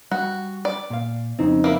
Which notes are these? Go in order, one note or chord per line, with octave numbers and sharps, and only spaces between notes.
G3 F#4
D5
A#2 F5
F2 C#3 C4 D#4
A#3 E4